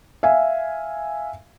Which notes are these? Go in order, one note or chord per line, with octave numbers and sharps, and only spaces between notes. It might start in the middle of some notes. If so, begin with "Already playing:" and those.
E5 F5 G#5